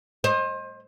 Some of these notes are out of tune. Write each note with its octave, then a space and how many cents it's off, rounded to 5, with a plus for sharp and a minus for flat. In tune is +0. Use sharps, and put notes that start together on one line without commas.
C5 +30 D#5 +0